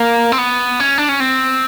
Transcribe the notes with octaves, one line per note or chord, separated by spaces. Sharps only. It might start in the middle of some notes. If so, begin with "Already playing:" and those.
Already playing: A#3
C4
B3
C#4
D4
C#4
C4